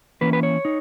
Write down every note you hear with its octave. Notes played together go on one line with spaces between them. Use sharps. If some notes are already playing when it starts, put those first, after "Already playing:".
E3 A#3 C#4 B4
B4
C#5
D#4